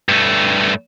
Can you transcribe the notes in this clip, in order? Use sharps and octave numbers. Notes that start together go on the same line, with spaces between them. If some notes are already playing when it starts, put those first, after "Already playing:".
G2 A3